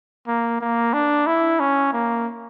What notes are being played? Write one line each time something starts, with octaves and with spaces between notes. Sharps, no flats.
A#3
A#3
D4
E4
C#4
A#3